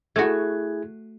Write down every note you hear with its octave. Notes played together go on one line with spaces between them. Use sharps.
A3 E4 F#4 G#4 G#6